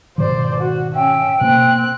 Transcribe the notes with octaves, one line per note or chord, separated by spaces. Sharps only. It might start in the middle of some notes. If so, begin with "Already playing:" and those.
G#2 B2 D#3 C5 D5
F#4
C#4 E5 G5
B2 A#3 C4 F#6